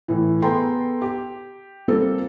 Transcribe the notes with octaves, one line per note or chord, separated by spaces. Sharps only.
A2 E3
B3 G#4 A4 G5 A#5 C6
G4
G3 A#3 C4 F4 A4